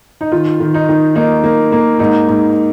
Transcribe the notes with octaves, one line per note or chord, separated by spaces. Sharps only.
D#4
D#3 F4
D#3
D#4
D#3
A#3 D#4
A#3
A#3
G#2 D#4
G#2